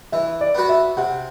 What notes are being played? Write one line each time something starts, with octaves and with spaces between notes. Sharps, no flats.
E3 E5
D5
B3 F#4 B4
E5
C3 F#5